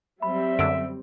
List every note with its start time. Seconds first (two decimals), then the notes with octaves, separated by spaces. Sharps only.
0.22 F#3 G3 C4 E5 B5
0.59 F#2 D3 E6 D7